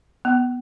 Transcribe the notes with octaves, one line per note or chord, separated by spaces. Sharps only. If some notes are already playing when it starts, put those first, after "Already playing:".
B3